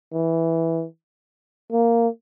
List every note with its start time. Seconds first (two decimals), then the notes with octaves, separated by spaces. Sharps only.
0.13 E3
1.72 A#3